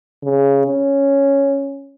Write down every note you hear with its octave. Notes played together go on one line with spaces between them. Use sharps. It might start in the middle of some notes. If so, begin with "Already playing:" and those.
C#3
C#4